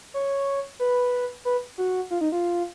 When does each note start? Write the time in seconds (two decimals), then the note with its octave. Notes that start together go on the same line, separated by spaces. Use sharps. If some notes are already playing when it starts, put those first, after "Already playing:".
0.14 C#5
0.79 B4
1.45 B4
1.78 F#4
2.11 F4
2.21 D#4
2.32 F4